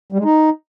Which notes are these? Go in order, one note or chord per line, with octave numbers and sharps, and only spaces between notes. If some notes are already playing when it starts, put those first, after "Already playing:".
G3
G#3
D#4